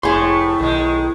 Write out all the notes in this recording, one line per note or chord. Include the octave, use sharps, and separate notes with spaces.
F1 A2 A3 E4 G#4 C6
B1 D#3 G#3